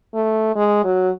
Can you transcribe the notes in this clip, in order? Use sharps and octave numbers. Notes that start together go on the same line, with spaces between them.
A3
G#3
F#3